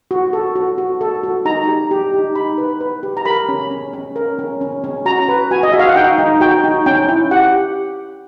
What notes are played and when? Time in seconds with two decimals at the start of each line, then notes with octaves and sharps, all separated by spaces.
0.11 F#4
0.33 A4
0.56 F#4
0.78 F#4
1.01 A4
1.23 F#4
1.45 D#4 A#5
1.68 G4
1.91 G4
2.14 D#4
2.35 D#4 B5
2.58 B4
2.81 B4
3.03 G4
3.17 A#5
3.25 A#4 B5
3.49 C#4
3.71 C#4
3.93 C#4
4.16 A#4
4.39 C#4
4.61 C#4
4.84 C#4
5.06 F#4 A#5
5.28 B4
5.51 F#4 G#5
5.63 D#5
5.72 F#4 E5
5.79 F5
5.88 F#5
5.96 D#4 G5
6.18 D#4
6.41 F#4 G5
6.64 D#4
6.86 C#4 G5
7.09 E4
7.31 G4 F#5